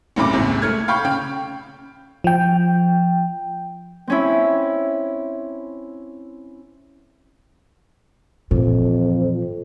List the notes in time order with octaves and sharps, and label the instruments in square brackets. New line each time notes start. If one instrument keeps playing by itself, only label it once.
[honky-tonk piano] F1 C2 A2 C#3 B5 D6
A#1 D#2 G#2 C3
A3 F6 G#6
F5 G5 B5 C#6 G6
C#3 G5 F6
[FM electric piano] F3 G5
[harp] C4 C#4 E4
[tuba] F2 [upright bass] A#2 E3